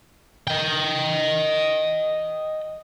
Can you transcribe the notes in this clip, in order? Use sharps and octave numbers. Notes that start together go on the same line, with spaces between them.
D#5 G5